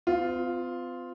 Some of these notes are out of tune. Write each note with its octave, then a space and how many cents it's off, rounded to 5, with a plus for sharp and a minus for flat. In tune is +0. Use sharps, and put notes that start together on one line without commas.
C4 -45 F4 +0